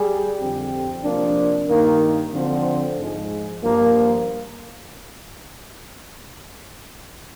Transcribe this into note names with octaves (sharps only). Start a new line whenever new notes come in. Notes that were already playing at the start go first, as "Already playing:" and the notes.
Already playing: G3 G#4
F2 D3 G3 C4 G4
C3 F3 A#3 D4
G2 D#3 A#3
D3 F3 C4 F4 C5
G#2 F3 G#3
G2 F3 A#3